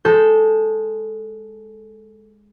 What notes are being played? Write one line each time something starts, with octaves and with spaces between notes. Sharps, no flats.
G#3 A4 G6